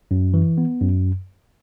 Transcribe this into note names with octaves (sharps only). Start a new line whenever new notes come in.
F#2
E3
B3
F#2